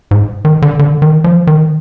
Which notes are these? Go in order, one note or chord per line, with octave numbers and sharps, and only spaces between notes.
G#2
D#3
D3
D3
D#3
F3
D#3